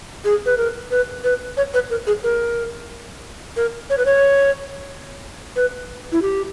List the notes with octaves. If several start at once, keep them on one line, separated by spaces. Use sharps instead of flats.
G#4
B4
A#4
B4
B4
C#5
B4
A#4
G#4
A#4
A#4
C#5
B4
C#5
B4
E4
G4